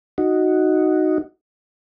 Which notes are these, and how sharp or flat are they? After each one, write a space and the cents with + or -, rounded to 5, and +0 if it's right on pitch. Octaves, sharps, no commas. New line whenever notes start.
D#4 +0 F#4 +0